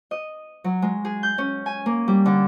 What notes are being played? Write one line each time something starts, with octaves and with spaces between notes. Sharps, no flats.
D#5
F#3
G#3
G#4
G6
C#4
G#5
A#3
G3
D3